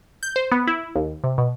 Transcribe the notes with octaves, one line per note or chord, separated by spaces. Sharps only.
G6
C5
B3
E4
D#2
C3
B2